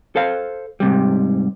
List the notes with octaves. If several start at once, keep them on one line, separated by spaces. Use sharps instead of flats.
A4 C5 F5
G#2 C3 G3